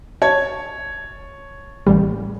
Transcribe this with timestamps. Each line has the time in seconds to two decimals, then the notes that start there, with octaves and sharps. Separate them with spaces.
0.22 C#5 A5 G#6
1.86 A1 G3